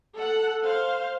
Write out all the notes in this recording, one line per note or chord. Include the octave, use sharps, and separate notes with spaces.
A4 F#5
C5 F5